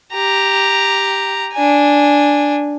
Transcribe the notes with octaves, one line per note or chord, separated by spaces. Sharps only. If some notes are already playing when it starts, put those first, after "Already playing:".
G4 A#5
D4 G#5